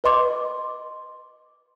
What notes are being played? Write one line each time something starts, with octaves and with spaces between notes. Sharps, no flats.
B4 D#5 C6 D6